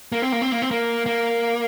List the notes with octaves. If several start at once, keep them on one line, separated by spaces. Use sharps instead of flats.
A#3
C4
A#3
C4
A#3
C4
A#3
A#3